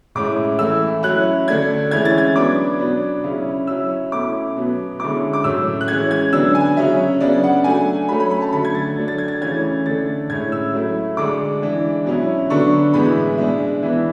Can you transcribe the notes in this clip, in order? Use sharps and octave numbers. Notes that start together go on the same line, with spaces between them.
A2 G#3 C#4 E4 D6
E3 A3 E4 E6
F#3 C#4 E4 F#6
D3 A3 D4 G#6
E3 G#3 C#4 E4 G#6
A6
G#6
F#3 B3 D4 D6
B2 F#3 B3 D4
C#3 F#3 C#4 E4
F#3 C#4 E4 E6
B2 A3 C#4 E4 D6
B2 F#3 B3
D3 G#3 C#4 E4 D6
D6
A2 F#3 A3 C#4 E6
F#6
E3 G#3 C#4 G#6
G#6
D3 F#3 B3 D4 E6
G#5
C#3 F#3 C#4 E5
C#3 F#3 B3 D4 D5
F#5
F#3 A3 D4 G#5
F#3 A3 C#4 B5
B5
B5
A5
D3 F#3 A3 B5
G#6
A6
F#3 A3 D4
A6
G#6
A6
C#3 E3 A3 C#4 G#6
D3 A3 D4 A6
A2 G#3 C#4 E4 G#6
E6
F#3 A3 E4
D3 G#3 D4 D6
E3 G#3 D4
B2 F#3 C#4 E4
D3 F#3 B3 D4 C#6
A2 E3 G#3 B3 B5
B2 G#3 D4 E5
E3 B3 D4